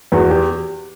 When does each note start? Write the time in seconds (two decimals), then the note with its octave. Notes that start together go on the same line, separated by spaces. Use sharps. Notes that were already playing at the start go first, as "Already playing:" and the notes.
0.12 E2 F#4
0.31 G4